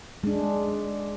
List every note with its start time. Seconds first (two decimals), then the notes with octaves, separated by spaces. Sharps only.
0.24 G#3 D4